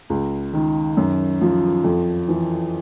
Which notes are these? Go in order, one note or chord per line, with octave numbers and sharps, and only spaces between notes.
C#2
D#3
F#2
F3
F2
E3